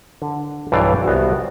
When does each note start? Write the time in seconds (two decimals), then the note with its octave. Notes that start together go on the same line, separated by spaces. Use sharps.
0.22 D3
0.72 B1 G2 E3 D5 F5 G5
1.04 C2 B3 F#4